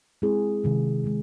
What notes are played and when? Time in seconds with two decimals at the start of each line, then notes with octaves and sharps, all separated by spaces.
0.22 G#3 C4 E4 G#4
0.64 C3 D#3 G#3
1.04 C3 D#3 G#3